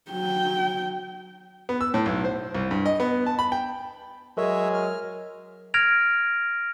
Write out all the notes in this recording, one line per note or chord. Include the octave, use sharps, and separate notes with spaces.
F#3 G5
B3
E6
A2
B1
C5
C2
G2
D#5
B3
A5
B5
G5
F#3 G#3 A#4 C#5 E5
F6
F6 G#6 A#6 D7 F7